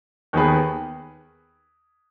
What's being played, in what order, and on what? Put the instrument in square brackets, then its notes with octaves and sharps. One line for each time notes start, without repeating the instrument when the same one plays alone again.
[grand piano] D#2 D#3 B3 G#4 B4